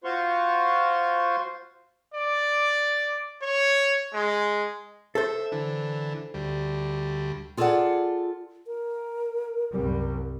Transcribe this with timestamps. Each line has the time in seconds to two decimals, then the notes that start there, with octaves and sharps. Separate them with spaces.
0.04 F4 F#4 C5 F5 C6 C#6
2.14 D5
3.42 C#5
4.13 G#3
5.15 A4 C5 E5
5.52 D3 E3
6.34 D2 G3
7.57 F4 G#4 A4 C#5 D5 F#5
8.67 A#4
9.73 C2 F#2 G3